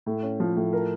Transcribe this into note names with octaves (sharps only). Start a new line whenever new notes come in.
A2
C#4
F3
A2
A#4